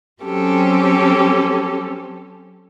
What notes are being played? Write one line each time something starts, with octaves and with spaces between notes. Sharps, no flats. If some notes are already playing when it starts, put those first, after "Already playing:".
F#3 C4 C#4 G4 A4